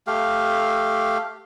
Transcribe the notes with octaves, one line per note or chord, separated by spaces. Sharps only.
A3 G4 F5